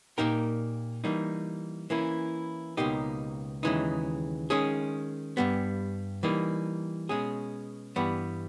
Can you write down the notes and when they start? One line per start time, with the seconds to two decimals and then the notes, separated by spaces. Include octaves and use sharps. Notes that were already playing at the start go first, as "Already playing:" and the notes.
0.18 A#2 A#3 D#4 G4 A#4
1.04 E3 G3 A#3 D#4
1.90 E3 A#3 C#4 E4
2.77 C#2 B2 A#3 D#4 G4
3.63 D#2 C#3 E3 G#3 D#4
4.50 D#3 G#3 C#4 G#4
5.37 G2 G3 B3
6.23 E3 G3 A#3 D#4
7.09 B2 G#3 C#4 G#4
7.96 G2 E3 G3 B3